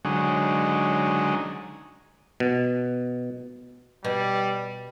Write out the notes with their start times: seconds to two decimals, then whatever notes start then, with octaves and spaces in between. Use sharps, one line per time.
0.05 D3 F#3 G#3 C#4 D#4
2.40 B2
4.04 B2 G3